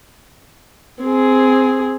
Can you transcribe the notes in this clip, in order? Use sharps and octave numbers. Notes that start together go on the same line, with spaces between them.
C4 G#4